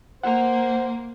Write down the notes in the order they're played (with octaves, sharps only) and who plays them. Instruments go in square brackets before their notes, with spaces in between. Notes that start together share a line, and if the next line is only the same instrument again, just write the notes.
[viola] A#3 [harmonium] C5 [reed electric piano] F#5